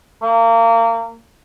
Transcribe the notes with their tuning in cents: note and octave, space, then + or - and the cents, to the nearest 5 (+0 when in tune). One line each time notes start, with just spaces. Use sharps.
A#3 -30